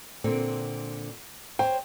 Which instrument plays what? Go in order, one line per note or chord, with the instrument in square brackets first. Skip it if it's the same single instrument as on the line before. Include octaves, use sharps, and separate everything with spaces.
[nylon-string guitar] A#2 D3 C4
[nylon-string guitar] C5 C#5 [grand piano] G5